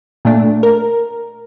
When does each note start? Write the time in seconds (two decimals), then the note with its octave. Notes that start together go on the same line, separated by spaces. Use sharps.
0.25 A#2 A3 D4
0.63 A#4